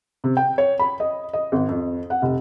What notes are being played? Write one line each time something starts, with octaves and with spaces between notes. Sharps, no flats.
C3
G5
C#5
B5
D#5
D#5
G#1
F2
F#5
F1